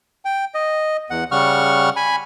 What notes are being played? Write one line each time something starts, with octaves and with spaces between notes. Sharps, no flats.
G5
D#5
E2 F#5
C#3 G3 F#5 C#6 F6
G#5 B5